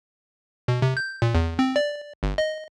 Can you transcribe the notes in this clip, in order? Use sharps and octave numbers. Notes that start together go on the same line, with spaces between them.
B2
C3
G6
A#2
E2
C4
D5
G1
D#5